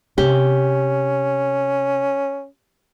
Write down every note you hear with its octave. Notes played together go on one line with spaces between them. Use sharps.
C3 C#4 G4